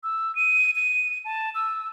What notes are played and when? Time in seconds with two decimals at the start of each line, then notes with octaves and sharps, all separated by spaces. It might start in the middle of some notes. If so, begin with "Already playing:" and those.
0.03 E6
0.35 D#7
0.75 D#7
1.25 A5
1.55 E6